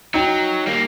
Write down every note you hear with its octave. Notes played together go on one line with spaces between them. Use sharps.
F#3 D#4 G5
G3 A#3